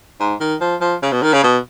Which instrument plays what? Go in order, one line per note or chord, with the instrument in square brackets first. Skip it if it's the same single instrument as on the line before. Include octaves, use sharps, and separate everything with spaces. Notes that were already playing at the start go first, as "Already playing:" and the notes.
[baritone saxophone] G#2
D#3
F3
F3
C#3
B2
D#3
C#3
B2